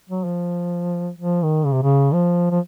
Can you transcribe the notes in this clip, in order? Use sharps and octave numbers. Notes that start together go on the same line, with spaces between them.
F#3
F3
F3
D#3
C#3
C3
C#3
F3
F3